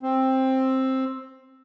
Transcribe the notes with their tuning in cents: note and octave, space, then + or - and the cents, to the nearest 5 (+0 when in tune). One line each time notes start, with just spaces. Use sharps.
C4 +10